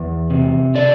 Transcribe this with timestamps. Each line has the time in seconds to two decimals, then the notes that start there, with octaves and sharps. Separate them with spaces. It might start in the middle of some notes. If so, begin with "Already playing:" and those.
Already playing: E2
0.30 C3
0.75 D3 D5